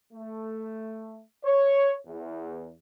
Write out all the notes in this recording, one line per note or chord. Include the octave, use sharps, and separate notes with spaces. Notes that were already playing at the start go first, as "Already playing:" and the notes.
A3
C#5
E2